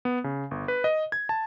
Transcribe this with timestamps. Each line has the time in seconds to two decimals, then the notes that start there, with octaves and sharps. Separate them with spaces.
0.05 B3
0.24 C#3
0.51 G1
0.68 B4
0.84 D#5
1.12 G#6
1.29 A5